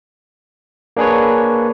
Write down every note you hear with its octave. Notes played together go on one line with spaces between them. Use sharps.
A#3 D4 G#4 B4 C#5